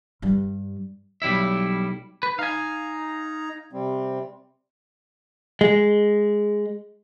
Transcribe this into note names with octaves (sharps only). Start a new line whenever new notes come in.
G2 G3
B1 G3 E4 E5
B4
D#4 F5 G#5 A#5
C3 G3 C4
G#3